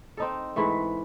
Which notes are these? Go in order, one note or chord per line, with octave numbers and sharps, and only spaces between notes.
C4 D#4 A4
G#2 E3 A3